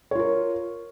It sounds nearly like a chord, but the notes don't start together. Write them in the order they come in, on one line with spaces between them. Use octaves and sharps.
C#5 F4 A#4